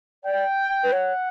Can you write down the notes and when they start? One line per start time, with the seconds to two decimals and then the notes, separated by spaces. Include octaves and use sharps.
0.24 D5 G5
0.84 B4
0.92 C#5 F#5